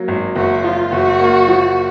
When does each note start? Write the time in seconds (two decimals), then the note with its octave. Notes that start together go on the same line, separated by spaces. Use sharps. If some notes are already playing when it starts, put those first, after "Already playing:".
Already playing: F#3 A#3
0.08 G#1
0.36 F#1 F#4
0.64 F3 F4
0.92 F#1 F#4
1.20 A#3
1.48 F3